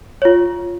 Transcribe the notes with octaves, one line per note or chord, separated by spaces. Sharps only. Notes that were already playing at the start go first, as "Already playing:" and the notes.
F4 C#5